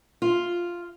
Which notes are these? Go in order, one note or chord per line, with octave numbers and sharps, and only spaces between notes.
F4